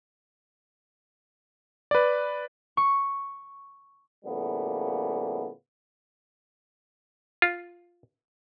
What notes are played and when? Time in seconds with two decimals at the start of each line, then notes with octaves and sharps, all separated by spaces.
1.91 B4 D5
2.77 C#6
4.25 A2 C#3 F3 G3 A#3 B3
7.42 F4